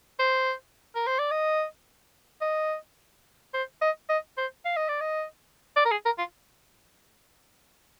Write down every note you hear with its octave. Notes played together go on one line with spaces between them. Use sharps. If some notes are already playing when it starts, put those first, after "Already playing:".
C5
A#4
C5
D5
D#5
D#5
C5
D#5
D#5
C5
F5
D#5
D5
D#5
D5
A#4
G#4
A#4
F4